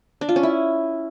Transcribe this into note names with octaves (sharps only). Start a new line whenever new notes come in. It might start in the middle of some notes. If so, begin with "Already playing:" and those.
D4
F4
C#4
E4